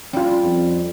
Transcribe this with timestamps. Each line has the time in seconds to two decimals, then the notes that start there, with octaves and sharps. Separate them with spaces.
0.13 G3 C#4 F4
0.43 F2